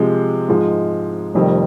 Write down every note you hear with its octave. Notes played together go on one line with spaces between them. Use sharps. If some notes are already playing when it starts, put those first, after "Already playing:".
Already playing: C3 F3 G#3
G#2 F3 G#3
F1 F2 D#3 G3